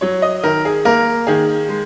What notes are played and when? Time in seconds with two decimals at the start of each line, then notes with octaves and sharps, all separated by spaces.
0.01 F#3 C#5
0.22 D#5
0.43 D#3 A#4
0.65 G#4
0.85 A#3 A#4
1.27 D#3 G#4
1.69 G#3